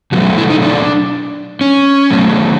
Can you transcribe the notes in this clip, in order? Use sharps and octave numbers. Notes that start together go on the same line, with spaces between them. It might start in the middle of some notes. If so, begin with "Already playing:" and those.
B2 F#3 A3 F#4
E4
D#4
D4
C#4
B2 F#3 A3